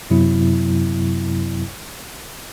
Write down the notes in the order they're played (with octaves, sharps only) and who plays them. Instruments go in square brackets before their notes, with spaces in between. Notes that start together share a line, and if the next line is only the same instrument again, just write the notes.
[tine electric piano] F#2 C3 F#3 B3 E4